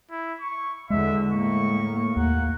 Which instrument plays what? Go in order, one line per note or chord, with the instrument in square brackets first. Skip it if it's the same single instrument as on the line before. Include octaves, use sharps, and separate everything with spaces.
[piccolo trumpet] E4
C#6
[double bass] E2 D3 [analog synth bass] G#3 [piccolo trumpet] E5
[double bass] A2 A#3 [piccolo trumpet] C#6
[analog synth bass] D#2 [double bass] A#3 [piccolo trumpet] F#5